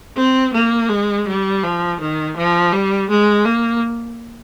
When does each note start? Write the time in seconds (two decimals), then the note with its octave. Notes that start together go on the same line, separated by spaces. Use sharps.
0.16 C4
0.53 A#3
0.89 G#3
1.27 G3
1.63 F3
2.00 D#3
2.37 F3
2.72 G3
3.09 G#3
3.45 A#3